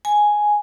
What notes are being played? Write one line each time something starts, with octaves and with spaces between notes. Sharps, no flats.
G#5